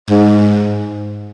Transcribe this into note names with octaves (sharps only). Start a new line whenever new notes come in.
G#2